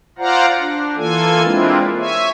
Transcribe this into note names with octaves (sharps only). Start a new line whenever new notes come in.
F4 C5 D5 F5 F#5 A#5
D4
E3 A#3 F4 A4 G#5
G#3 A#3 C4 D4 E4 F4
C#5 E5 G#5